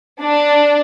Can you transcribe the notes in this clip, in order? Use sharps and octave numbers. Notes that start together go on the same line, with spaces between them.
D4